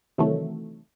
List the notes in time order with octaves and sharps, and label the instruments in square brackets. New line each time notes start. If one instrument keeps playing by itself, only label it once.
[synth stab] C3 D#3 E3 F#3 A3